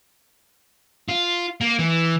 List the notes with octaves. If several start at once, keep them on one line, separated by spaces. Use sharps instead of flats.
F4
A#3
E3